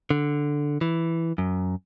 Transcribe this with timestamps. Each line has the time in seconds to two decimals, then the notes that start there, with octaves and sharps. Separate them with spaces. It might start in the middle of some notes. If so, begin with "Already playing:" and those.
0.11 D3
0.81 E3
1.38 F#2